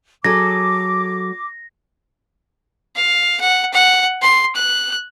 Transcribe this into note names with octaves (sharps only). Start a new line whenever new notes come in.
F#3 G#4 A4 D6 A#6
F5
F#5
F#5
C6
F#6